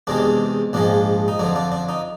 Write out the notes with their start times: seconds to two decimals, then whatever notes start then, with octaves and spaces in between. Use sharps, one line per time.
0.07 E2 C3 D#3 G#3 D4
0.73 A#1 G#2 F3 G#3 D4
1.28 D#4
1.39 F2 D3 F3 D4
1.56 D4
1.72 D4
1.89 D#4